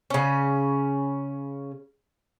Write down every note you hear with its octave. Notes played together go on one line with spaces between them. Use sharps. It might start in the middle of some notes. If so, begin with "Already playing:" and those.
C#3 C#4